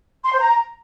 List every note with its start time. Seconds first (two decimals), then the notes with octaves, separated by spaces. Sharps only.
0.24 C6
0.32 C5
0.40 A#5